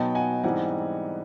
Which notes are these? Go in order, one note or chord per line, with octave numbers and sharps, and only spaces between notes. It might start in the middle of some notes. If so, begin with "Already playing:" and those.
Already playing: B2 F#3 B3 D#4 G5 A5
F#5 G#5
G#2 E3 G3 C4 D#4 F#5 G#5